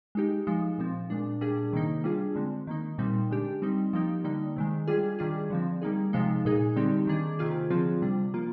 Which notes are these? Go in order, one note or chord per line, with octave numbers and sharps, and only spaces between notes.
G#3 D#4 G4
F3 G#3 D#4
A#2 F3 C4
A#2 G#3 D4
A#2 G3 D4 G#4
C3 D#3 A#3 D#4
G3 D4 F4 G#4
D3 G#3 C4
D#3 A#3 D#4
A#2 G3 C4 D#4
D3 G#3 D4 G4
G3 C4 D#4
F3 A#3 D#4 G4
D3 G3 A#3 D#4
C3 D#3 G#3
G3 D4 F4 G#4
D#3 G3 D4 F4 G#4
D3 F3 C4
G3 A#3 D#4 G#4
C3 F3 G#3 D#4
A#2 G#3 D#4 G#4
D3 G3 C4 D#4 G4
D#3 A#3 D4 G#4
C3 D#3 A#3 F4 G#4
D3 F3 C4 F4 G#4
C3 G3 D4
F3 A#3 F4